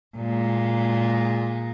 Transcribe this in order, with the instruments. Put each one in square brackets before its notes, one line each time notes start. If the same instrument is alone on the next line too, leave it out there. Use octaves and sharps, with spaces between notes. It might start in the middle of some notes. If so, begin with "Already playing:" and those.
[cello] A#2 G#3